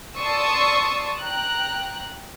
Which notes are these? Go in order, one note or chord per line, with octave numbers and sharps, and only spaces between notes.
D5 A5 C6 C#6 D#6 E6
G5 A#5 F#6